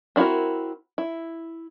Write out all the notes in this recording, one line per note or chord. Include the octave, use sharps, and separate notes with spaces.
C4 D4 E4 F#4 A#4
E4